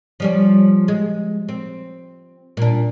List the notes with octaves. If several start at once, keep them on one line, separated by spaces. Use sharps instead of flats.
F3 G3 C#4
G#3
C4
A#2 D4